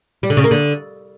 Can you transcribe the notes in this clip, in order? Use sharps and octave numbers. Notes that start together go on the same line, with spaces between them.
G3
D3
C#3
A#3
D3